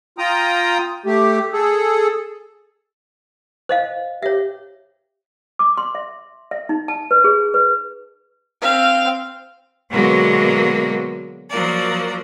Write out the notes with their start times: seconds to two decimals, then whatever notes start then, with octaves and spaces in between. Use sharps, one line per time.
0.18 F4 G5 A#5 D#6
1.06 A3 G4
1.53 G#4 A4
3.69 C5 D#5 F5
4.23 G4 C#5 E5
5.59 D6
5.78 C6
5.95 E5
6.51 E5
6.69 D#4
6.88 A5
7.11 B4
7.24 G#4
7.54 B4
8.62 C4 F5
9.90 B2 D3 F#3 G#3 A#3 B3
11.49 F3 F#3 A#3 D5